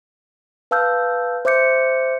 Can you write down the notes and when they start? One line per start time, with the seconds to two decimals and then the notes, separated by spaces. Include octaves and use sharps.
0.71 B4 F5 A5 E6 F6 G6
1.45 C5 E5 D6 G6 C#7